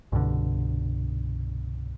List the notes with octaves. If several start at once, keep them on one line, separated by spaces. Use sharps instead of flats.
C2 G2 B2 D3